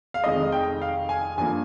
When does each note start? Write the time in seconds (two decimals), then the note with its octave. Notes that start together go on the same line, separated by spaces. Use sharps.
0.14 F5
0.24 F1 F2 D#3 G#3 D#5
0.52 G5
0.82 F5
1.09 G#5
1.37 G2 F3 A#3 G#5